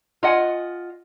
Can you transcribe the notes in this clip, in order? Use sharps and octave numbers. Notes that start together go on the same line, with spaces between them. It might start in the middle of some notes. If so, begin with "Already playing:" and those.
F4 D#5 F#5 G#5